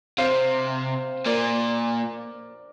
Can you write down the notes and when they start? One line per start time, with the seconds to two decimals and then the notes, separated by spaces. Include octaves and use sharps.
0.18 C3 C5 F5
1.25 A#2 A#4 D5